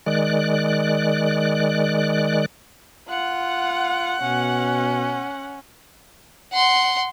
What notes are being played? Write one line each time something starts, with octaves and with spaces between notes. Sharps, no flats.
D#3 G#3 D5 F#6
F4 F#5
B2 C#4
F#5 C6